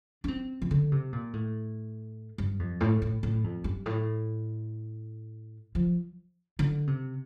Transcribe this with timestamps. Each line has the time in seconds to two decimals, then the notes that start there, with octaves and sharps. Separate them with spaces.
0.24 D4
0.28 C4
0.62 E3
0.71 D3
0.92 C3
1.13 A#2
1.33 A2
2.38 G2
2.59 F2
2.81 A2
3.02 A2
3.23 A2
3.44 F2
3.64 G2
3.86 A2
5.75 F3
6.59 D3
6.87 C3